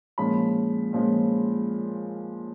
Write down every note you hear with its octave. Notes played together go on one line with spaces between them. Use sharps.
A#2 F3 G#3 C#4 B5
A#2 F3 G#3 C#4